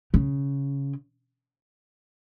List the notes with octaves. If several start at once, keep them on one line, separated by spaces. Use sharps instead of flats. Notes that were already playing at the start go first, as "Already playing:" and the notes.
C#3